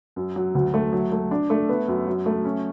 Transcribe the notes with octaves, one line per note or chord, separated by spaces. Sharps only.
F#2
F#3
D2
A3
F#3
A3
D4
A3
B3
F#2
F#3
A3
C#4